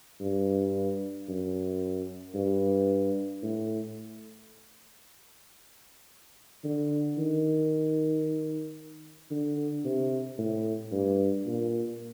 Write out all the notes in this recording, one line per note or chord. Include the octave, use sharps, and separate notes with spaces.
G2
F#2
G2
A2
D3
D#3
D3
C3
A2
G2
A#2